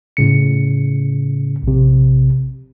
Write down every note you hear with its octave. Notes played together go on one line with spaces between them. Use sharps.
A2 C#3 C#7
A#1 C3